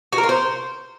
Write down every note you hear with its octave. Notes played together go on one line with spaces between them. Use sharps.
F#4
A#4
F4
C5